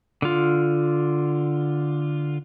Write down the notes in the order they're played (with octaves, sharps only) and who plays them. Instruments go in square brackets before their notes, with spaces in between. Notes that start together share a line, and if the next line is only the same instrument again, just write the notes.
[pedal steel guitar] D3 F4